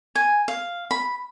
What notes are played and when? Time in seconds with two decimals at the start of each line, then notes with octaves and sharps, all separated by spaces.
0.15 G#5
0.48 F5
0.91 B5